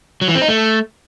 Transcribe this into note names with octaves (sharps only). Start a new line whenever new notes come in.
F#3
E3
C4
D#4
A3